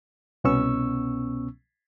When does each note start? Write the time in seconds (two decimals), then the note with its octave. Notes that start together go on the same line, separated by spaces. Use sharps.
0.44 C2 B2 B3 C#4 C#6 E6